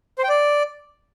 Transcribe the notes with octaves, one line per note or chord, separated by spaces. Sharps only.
C5
G5
D5